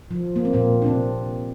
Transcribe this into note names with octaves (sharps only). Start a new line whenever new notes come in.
F3
A#3
C4
A#2 A#3
D4
C3 C4